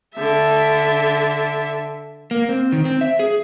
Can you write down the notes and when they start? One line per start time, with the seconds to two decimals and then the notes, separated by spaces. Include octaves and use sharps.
0.15 D3 E5
2.31 A#3
2.49 C4
2.72 D#3
2.85 C4
3.01 E5
3.19 G#4